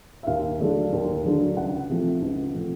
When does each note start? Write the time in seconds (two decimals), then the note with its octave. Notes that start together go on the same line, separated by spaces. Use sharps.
0.23 E5
0.27 D#2 F5
0.60 D3 F#3 A3 D4
0.93 D#2
1.25 D3 F#3 A3 D4
1.57 C#2 F#5
1.90 C3 F3 A3
2.22 C#2
2.54 C3 F3 A3